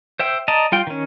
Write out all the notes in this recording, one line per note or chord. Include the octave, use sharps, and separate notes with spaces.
C5 E5 G5
D5 D#5 A5 A#5
G3 F4 G5
D#3 C#4